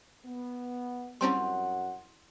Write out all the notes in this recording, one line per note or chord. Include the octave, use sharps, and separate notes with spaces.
B3
F#2 G3 C4 C#4 E4 F#5 C6